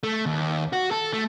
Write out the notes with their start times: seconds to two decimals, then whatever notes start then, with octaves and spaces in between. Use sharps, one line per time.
0.03 A3
0.26 D#2
0.73 F#4
0.91 A4
1.13 A3